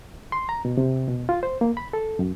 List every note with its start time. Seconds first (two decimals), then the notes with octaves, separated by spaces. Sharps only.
0.32 C6
0.49 A#5
0.65 B2
0.78 C3
1.08 B2
1.29 F4
1.43 C5
1.61 A#3
1.77 B5
1.93 A4
2.19 F#2